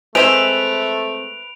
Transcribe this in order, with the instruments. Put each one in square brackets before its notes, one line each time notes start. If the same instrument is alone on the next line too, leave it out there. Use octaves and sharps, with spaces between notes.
[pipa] G#3 C4 [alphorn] A3 [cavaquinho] B4 E5 C6 [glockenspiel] D7 F7